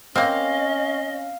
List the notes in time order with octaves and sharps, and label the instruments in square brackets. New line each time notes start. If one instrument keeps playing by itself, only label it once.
[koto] A#3 C4 [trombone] C#4 [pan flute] D#5 [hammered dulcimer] F5